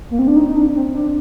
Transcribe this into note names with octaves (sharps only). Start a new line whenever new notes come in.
A#3
C4
D4
D#4
D#4
D4
C4
D4